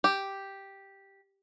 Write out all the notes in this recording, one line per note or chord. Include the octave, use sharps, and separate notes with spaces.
G4